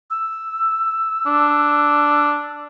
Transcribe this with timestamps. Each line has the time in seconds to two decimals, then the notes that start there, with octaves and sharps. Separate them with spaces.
0.11 E6
1.26 D4